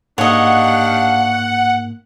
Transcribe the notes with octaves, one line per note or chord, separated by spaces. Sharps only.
G#2 A#3 D4 G4 C#5 D#5 F5 F#5